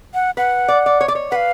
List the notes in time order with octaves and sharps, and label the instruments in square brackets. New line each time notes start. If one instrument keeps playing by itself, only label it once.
[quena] F#5
[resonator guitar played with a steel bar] B4 [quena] F#5
[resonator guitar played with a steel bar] D5
D5
C#5
D5
C#5
[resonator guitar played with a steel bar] B4 [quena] F5 F#5